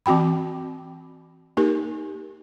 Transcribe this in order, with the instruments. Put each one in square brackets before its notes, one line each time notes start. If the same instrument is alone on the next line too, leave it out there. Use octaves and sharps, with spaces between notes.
[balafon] E3 C4 F#4 G5 B5
A#3 D#4 G4 A#4